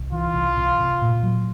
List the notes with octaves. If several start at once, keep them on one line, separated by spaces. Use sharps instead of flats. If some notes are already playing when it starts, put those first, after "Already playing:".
Already playing: C2
E3 F4
C2
C3
C3
A#2
F#3